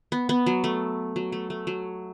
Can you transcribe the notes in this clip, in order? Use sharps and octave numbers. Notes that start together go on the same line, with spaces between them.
B3
B3
F#3
A3
F#3
A3
A3
F#3